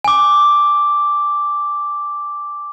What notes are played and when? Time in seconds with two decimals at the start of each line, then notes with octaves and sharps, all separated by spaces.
0.04 G#5 D6